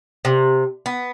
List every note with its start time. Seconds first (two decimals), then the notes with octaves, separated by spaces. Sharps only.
0.25 C3
0.86 B3